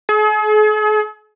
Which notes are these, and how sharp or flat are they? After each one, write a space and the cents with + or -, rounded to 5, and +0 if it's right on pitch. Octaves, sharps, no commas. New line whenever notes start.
G#4 +45